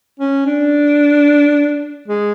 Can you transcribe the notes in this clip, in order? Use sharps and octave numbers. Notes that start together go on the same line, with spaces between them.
C#4
D4
G#3